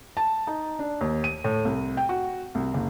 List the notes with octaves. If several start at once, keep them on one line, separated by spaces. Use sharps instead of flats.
A5
D#4
D4
D#2
D#7
A2
C2
G5
F#4
C2
F#1